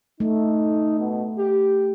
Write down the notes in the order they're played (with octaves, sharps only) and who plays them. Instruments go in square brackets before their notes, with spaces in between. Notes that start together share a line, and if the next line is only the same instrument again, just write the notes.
[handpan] A3 [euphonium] D#4
[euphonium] B2
G4